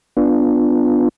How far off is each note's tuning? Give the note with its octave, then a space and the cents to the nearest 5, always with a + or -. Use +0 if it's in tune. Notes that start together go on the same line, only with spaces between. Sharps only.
B3 +0 D4 +0 F4 +0